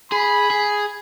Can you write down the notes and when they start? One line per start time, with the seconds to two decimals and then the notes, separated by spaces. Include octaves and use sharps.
0.12 G#4 B5
0.50 G#4